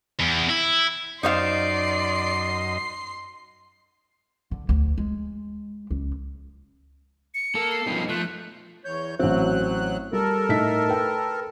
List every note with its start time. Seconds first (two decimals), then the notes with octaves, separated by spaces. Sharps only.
0.20 E2
0.50 E4
1.23 F#2 D#4 C5 D5 D#5 F5 C6 C7
4.51 D3
4.69 D2
4.98 G#3
5.91 C#2
7.34 C#7
7.55 A#3 A4
7.72 C7
7.87 G2 F3 B3 D#4
8.09 F3 A3 F#6
8.85 E2 C#5 G6
9.19 A1 F#3 C4 F#6
10.13 G3 A4 A#4
10.49 A2 D#4 B6
10.89 B4 G5